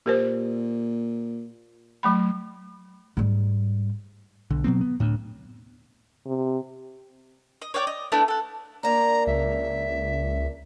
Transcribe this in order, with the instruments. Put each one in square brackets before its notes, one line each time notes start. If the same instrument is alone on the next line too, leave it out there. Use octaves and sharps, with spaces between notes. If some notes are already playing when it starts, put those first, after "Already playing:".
[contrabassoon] A#2 [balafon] G4 A#4 C5
[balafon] F#3 A3 B5
[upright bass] G#2 G3
[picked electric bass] B1 D3
B2 F#3 B3 C4
B3
D2 A2
[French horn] C3
[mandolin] D#5
C#5 D5 F#5 G5
D#5
A3 B3 D4 E4
A4 F#5
[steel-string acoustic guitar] A#3 D4 [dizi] A#5
[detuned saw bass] C#2 [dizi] E5